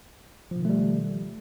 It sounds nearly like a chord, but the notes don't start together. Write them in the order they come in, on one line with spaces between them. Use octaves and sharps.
F3 B2 D#3 A3 G3